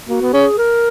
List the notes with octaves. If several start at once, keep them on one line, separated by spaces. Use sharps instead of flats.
A#3 F#4
B3
C#4 G#4
A#4